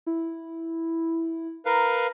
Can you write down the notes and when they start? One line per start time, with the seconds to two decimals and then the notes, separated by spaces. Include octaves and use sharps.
0.07 E4
1.66 A#4 B4 F5 A#5